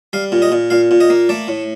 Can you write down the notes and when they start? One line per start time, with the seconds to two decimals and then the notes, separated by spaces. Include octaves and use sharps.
0.13 G3 F5
0.32 A#2
0.42 D#5
0.52 A#2
0.70 A#2 F5
0.91 A#2
1.00 D#5
1.10 A#3
1.29 A3 D5
1.48 A2